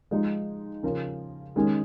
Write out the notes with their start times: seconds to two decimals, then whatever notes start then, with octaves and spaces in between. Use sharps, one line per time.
0.11 F3 G#3 D#4
0.83 C#3 F3 C#4 A#4
1.56 D#3 G#3 C#4 G#4